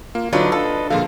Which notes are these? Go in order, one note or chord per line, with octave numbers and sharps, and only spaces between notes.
A#3 F4
D3 F#3 D4 D#4 F4 B4 D#5
F4 A4
A#2 D3 F3 A#3 F4 G#4 F5